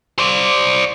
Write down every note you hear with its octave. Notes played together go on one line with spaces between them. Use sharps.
C5 D5